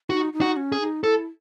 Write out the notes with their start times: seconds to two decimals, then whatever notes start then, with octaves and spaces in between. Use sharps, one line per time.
0.10 D#4 F#4
0.33 D#4
0.41 F#4
0.56 C#4
0.72 G#4
0.81 D#4
1.04 E4 A4